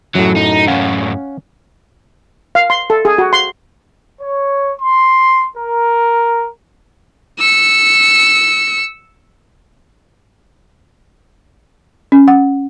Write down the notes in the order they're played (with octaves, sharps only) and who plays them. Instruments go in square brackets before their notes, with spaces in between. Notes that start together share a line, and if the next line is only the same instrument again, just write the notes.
[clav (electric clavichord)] F#2 A2 [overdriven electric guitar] F#3
[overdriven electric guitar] D#4
[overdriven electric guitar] F#2 A2 [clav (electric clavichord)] C#4 F5 F#5
[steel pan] F5
C6
A4
G#4
F#4
C6
[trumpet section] C#5
C6
A#4
[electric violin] E6 C#7
[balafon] C#4
F#5